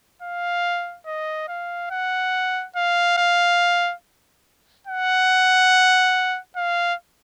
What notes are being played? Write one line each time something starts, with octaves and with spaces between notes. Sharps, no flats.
F5
D#5
F5
F#5
F5
F5
F#5
F5